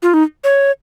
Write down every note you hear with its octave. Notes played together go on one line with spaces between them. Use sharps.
F4
D#4
C#5